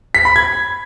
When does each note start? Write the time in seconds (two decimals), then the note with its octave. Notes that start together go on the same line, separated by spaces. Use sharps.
0.15 B6
0.25 B5
0.36 G#6